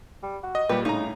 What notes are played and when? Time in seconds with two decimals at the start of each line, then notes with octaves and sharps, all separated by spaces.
0.22 G3
0.43 F#4
0.55 D#5
0.69 A#2 G3 G4 B4
0.85 A2 C#3 D#4 A#5